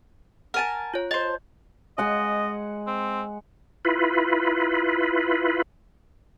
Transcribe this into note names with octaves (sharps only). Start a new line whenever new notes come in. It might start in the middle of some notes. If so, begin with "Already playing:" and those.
A#4 F#5 G#5 A5 F6
F4 C#5
C5 D#5 A5
G#3 D#5 F#5 G#5
C4
E4 F4 B4